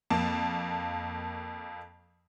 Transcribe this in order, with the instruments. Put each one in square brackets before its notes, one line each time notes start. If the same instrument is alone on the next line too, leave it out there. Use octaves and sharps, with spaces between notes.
[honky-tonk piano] F2 A#3 A5